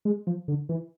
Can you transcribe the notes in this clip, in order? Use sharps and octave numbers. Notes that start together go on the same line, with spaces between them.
G#3
F3
D3
E3